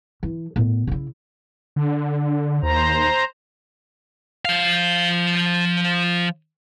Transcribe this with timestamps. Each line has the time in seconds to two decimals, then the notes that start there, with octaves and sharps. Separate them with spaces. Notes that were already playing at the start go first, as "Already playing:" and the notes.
0.23 E3
0.56 A2 B3
0.87 C#3 E4
1.76 D3
2.63 D#2 C5 A#5
4.45 F3 F5